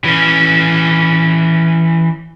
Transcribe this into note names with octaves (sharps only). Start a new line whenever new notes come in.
E3 C#4